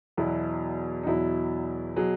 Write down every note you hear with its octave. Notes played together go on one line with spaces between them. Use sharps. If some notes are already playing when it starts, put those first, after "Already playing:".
E2 B2 F#3 E4
D#4
E2 B2 F#3 E4
B2 F#3 G#4